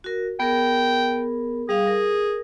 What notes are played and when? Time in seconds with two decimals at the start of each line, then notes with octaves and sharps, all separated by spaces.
0.04 F#4 A#4
0.40 B3 G#4 A#4 G5
1.69 G3 G#4 F5
1.87 A#4